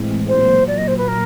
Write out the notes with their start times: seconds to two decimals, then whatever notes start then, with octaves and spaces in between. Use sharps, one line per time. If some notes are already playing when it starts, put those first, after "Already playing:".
Already playing: A2 E3 G#3 C4
0.27 A#2 F#3 A#3 C5
0.67 D5
0.77 D#5
0.87 C5
0.97 B4
1.08 A#4